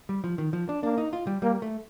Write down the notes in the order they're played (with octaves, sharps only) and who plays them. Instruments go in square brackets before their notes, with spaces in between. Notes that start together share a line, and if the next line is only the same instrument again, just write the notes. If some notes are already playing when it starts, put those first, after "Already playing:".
[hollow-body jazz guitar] G3
F3
D#3
F3
D4
[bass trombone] A#3 [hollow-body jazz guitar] D4
[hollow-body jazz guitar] D#4
F4
G3
[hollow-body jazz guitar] G3 [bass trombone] A#3
[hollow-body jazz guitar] A3